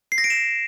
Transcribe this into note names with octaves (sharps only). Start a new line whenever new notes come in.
C7
A#6
D7
E7